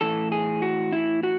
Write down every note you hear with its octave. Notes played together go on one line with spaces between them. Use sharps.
A2 E3 A4
G#4
F#4
E4
F#4